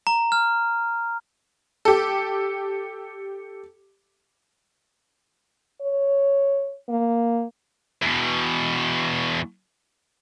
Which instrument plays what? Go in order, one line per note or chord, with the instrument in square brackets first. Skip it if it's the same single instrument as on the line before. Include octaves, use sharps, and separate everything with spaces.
[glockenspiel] A#5
F6
[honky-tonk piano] G4 A4
[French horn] C#5
A#3
[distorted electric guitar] E2 B2